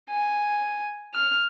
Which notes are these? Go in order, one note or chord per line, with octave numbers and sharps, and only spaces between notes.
G#5
F6